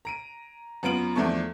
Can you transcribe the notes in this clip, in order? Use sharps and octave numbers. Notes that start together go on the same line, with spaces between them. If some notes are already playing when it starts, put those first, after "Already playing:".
A#5 D7 D#7
F#2 B3 F4 D7 F#7
E2 F3 A3 D4 A5 C#6